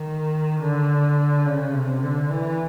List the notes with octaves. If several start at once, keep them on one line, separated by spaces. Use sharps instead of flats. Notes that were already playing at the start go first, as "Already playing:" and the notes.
Already playing: D#3
D3
C#3
C3
D3
E3